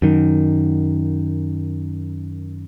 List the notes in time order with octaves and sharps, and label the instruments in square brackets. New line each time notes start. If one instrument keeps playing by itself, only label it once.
[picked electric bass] F#2 D#3